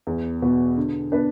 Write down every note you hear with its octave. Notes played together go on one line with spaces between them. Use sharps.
E2
B2 B3 F#4
D3
B3 D4 B4